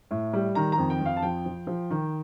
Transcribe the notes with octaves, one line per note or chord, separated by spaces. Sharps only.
A2
G3
D#3 A#5
A#5
F2
G5
F2
F5
A5
F3 G5
F3
F3
D#3